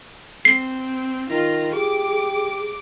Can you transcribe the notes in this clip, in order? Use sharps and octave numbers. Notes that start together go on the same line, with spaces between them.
C4 C7
D#3 F4 A#5
G4 G#4 D6